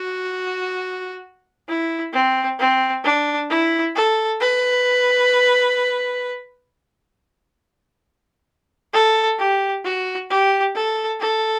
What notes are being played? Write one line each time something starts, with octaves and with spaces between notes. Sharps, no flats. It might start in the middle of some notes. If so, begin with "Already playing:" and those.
Already playing: F#4
E4
C4
C4
D4
E4
A4
B4
A4
G4
F#4
G4
A4
A4